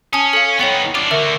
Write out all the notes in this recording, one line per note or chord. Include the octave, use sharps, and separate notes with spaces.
C#4 G#5 A5 D#6
A4 F5
B3 D#4 C#5 G5 C#6
D4 F4 D6
D3 F#4 A#4 E5